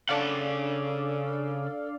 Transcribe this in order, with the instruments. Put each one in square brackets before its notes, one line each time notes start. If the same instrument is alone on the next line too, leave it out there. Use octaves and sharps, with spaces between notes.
[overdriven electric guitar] C#3 F#5 [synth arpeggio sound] D4 D5 F5 [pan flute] A4